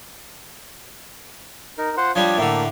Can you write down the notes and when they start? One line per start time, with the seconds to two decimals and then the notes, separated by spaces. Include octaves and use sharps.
1.78 D#4 A#4
1.97 F4 C5 F#5
2.15 F3 G3 D4 C#5 D#6
2.38 A2 D3 A3 A#3